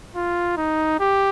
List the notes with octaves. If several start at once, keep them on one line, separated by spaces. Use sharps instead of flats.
F4
D#4
G4